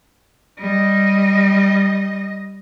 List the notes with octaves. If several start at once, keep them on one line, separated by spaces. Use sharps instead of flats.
G3 D#5